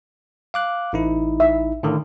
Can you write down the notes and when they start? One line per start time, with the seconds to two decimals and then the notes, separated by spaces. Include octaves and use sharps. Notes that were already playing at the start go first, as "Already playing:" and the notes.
0.54 F5 D6 F#6
0.93 A1 D#4 E4
1.40 E5
1.83 A2 D3 D#3